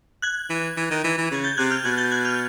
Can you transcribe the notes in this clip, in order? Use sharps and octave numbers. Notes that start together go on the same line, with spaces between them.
F#6 G#6
E3
E3
D#3
E3
E3
C#3 G#6
G6 A6
C3 F#6 G#6
F6 G6
B2 F#6 G#6
G6 A6
F#6 G#6
F6 G6